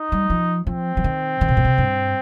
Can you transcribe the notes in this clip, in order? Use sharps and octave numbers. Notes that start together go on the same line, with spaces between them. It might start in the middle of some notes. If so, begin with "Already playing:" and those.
Already playing: D#4
G3
F3
F3 C4
F3
D#3
D#3
C3
A#2
C3
G2